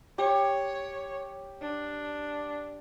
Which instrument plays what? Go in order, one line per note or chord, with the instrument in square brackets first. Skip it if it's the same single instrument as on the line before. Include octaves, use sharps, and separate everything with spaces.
[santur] G4 [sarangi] C#5
[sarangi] D4